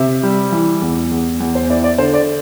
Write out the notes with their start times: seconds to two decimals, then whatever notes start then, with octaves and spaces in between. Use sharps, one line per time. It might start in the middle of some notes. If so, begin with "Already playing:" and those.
Already playing: C3 E5
0.23 G3
0.52 E3
0.82 E2
1.11 E2
1.40 E2
1.55 C5
1.69 E4 D5
1.84 D5
1.98 D3 C5
2.14 D5